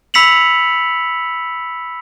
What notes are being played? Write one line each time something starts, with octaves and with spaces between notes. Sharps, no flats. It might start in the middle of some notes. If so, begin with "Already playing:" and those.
B5 E6 B6 C#7 F7 F#7